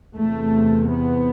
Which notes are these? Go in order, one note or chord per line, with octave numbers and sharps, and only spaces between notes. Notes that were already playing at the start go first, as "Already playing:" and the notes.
E2 C3 A3
B3